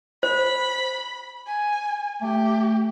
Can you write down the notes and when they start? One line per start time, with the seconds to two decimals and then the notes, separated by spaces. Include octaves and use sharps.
0.23 C5 B5
1.47 G#5
2.22 A3 G4